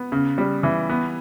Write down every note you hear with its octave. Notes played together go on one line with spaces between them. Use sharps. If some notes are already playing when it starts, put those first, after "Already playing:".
Already playing: B3
C#3
G3
E3
B3